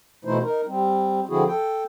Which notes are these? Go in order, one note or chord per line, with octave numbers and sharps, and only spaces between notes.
B2 E3 A3 D#4 E4 C5
D#4 A#4
G3 C4
D3 F3 C4 E4 F#4 G#4
A4 G5